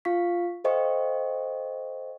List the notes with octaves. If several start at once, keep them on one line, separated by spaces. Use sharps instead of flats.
F4 F5 C#6 B6
A4 C5 D#5 F5 G5 C#6